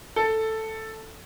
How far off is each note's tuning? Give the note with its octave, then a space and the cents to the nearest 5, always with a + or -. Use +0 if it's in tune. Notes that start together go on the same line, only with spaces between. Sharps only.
A4 +5